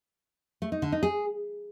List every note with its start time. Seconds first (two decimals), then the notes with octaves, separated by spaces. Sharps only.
0.62 A3
0.72 D#4
0.82 D3
0.92 D#4
1.03 G#4